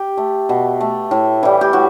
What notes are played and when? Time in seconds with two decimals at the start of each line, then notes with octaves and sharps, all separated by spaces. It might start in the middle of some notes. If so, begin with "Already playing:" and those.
Already playing: G4
0.17 A3
0.49 B2
0.80 A3
1.11 A2
1.43 E3 G3
1.61 G4
1.73 A2 F#4